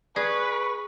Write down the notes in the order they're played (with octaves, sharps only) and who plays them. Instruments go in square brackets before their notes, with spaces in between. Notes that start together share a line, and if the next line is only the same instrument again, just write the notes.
[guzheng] G#4 [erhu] B4 [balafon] D5 [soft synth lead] C#6